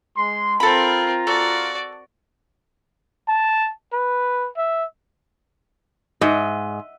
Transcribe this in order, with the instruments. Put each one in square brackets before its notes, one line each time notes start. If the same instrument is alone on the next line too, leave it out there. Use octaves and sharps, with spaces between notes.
[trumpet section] G#3 C6
[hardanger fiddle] C4 A#4 [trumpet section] F4 A#5 [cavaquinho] A4 B5
[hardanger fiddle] F#4 D5 [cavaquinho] A4
[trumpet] A5
B4
E5
[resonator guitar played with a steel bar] G#2 [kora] D#5 E5